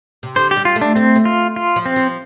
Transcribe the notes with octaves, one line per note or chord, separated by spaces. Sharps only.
C3
D3 C5
G4
G3
F4
A3
D4
A3 C4
A3
F4
F4
F3
C4
F3